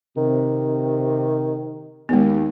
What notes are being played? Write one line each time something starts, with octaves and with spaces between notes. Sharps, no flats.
C3 D#3
D#2 G#3 B3